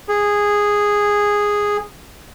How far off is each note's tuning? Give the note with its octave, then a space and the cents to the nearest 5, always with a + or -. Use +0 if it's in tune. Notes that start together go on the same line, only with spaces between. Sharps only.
G#4 -10